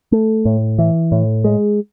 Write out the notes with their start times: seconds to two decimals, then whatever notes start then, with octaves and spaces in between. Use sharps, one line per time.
0.12 A3
0.45 A2
0.79 E3
1.12 A2
1.44 G#3